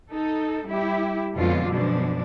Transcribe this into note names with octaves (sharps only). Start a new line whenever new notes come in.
D#4 A4
G3 E4 G4
F2 B2 D3 F#3 G#3 F4
F#2 B2 F3 G#3 D4